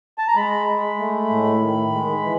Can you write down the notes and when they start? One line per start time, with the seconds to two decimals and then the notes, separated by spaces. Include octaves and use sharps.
0.18 A5
0.28 A#5
0.36 G#3 B5
0.67 G#3
0.99 A3
1.30 A2
1.61 D#3
1.92 G#3
2.23 E3